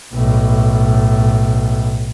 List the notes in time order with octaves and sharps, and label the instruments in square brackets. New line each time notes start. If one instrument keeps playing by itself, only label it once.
[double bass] B1 A2